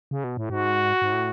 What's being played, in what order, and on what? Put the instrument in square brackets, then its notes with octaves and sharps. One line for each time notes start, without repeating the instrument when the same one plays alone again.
[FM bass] C#3
B2
A2
[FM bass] G#2 [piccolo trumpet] F#4
[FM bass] G#2
A2